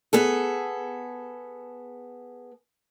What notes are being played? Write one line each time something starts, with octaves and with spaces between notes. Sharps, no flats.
B3 G#4 A4